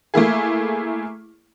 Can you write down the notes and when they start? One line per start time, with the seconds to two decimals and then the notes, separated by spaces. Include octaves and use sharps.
0.14 A3 A#3 E4 G#4